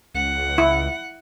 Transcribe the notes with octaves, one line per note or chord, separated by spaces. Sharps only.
C#2 F#5
E4